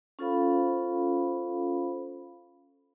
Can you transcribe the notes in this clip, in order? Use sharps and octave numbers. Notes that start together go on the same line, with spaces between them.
C#4 F4 A4 C5 F5 B5